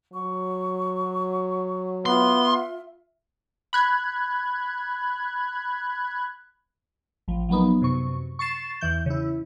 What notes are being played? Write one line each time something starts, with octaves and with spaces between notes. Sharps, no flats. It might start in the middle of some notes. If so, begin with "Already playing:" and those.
F#3 C#6
B3 F4 E5 C6
B5 F#6 G#6
A1 F3
F3 F#3 A#3 B3 D#4
F#2 C3 C#6
C#6 A6 C7 E7
E2 E3 G6
C#3 E4